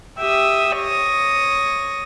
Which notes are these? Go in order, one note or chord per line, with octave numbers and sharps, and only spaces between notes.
G4 E5 G5 D#6
C#5 D#6 A#6